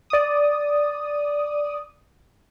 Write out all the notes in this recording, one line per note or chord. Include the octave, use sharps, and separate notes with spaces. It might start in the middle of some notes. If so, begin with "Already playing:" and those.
D5 D#6